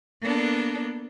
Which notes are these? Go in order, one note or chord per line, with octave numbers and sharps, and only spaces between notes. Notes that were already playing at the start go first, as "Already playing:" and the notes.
A#3 B3 D4 A4